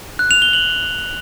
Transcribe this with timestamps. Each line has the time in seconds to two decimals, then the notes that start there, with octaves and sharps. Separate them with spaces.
0.19 F#6
0.31 F7
0.42 G7
0.53 F#7